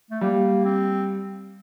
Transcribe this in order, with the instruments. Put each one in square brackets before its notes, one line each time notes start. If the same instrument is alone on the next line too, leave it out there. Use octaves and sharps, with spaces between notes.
[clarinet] A3
[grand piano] G3 [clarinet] A#3
[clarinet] C4